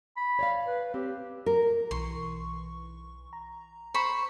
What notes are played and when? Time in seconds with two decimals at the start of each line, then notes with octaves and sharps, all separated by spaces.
0.17 B5
0.39 C#5 D5 F5
0.66 B4
0.94 C4 G4
1.46 A#4
1.91 B1 E3 C6 C#6
3.33 A#5
3.94 C5 B5 C#6